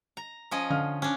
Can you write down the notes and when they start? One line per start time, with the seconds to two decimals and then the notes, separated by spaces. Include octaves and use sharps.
0.17 A#5
0.51 F3 C#4 D#5
0.70 D3 F5 F6
1.02 C#4 D4